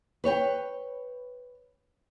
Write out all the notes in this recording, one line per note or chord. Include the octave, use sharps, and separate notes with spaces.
B4 C#5 F#5 G5